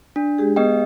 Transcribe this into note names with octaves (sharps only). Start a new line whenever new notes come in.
D4
G#3 G4 G#4
B3 G#4 D#5 G5